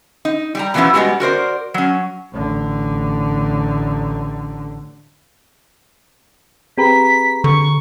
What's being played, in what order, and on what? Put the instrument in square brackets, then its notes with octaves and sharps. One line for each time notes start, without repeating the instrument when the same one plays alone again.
[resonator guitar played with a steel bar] D#4
G3 G4 A#5
B2 E3 F3 B3 C#4 E4
G3 G#3 B3 C4 F#4 G4
F#4 A#4 C5 D5
F#3 C#4
[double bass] A1 D3
[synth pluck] C4 G4 B4 [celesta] G#4 A#5 B5 [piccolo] B6
[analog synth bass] D3 [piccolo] C#6